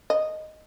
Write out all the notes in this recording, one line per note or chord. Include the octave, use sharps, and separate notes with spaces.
D#5